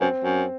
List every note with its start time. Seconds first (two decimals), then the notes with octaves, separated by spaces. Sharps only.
0.01 F#2 C4
0.24 F#2